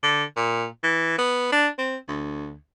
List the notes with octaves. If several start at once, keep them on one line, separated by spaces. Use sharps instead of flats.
D3
A#2
E3
B3
D4
C4
D2